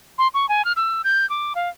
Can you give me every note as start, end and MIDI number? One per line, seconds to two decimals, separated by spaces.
0.18 0.28 84
0.34 0.48 85
0.49 0.65 80
0.65 0.72 89
0.76 1.02 88
1.04 1.28 91
1.30 1.53 86
1.55 1.69 77